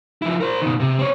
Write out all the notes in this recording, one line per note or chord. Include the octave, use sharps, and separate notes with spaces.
F3 E4
A#4 C5
B2 D#3
C3
C4 C#5